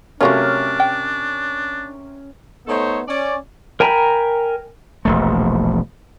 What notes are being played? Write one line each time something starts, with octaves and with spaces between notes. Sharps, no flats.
C3 F#3 A3 C#4 D4 F4 A#4
G5
A3 B3 D#4 A4 C5 C#5
C#4 D5
A#4 G5 G#5 A#5 B5
E1 A#1 A3